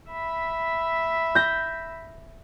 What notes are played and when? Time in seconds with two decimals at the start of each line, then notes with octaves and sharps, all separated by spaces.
0.11 E5 B5
1.35 G6 A#6